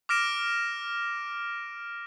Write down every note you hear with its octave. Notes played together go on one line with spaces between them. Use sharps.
D6 F6 A#6 D7 E7